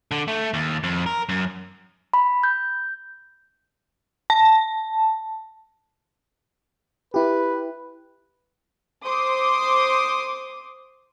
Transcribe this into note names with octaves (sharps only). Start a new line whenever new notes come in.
D3
A3
D#2
F2
A#4
F#2
B5
G6
A5
E4 G4 B4
C5 C6 D6 D#6